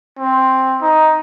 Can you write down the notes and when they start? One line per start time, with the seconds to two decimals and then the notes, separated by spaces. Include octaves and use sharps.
0.19 C4
0.82 D#4